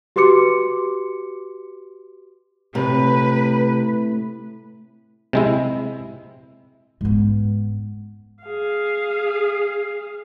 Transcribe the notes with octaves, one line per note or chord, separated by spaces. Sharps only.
F#4 G4 B4 C6 D6 C#7
A2 C3 B4
C3 G#3 E4
G#2 B3
G#4 F5